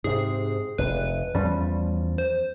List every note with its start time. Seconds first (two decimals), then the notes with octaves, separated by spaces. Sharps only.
0.04 G#2 C3 G#4
0.78 F1 B4
1.35 E2 F3 G3 C#4
2.18 C5